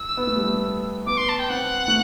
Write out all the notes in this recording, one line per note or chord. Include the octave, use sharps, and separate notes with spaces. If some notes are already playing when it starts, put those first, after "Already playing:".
Already playing: E6
B3
A3
G3
A3
B3 D6
C6
A5
G5
C4 F#5
A3